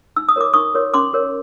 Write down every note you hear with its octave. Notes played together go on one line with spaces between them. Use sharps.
D#4 E6
D#6
F#4 A#4 C#5 D6
D#4 C#6 D#6
F#4 A#4 C#5
C#4 C6 D6
F#4 A#4 C#5